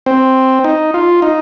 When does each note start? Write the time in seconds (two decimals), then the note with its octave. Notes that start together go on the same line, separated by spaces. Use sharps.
0.06 C4
0.64 D#4
0.94 F4
1.22 D#4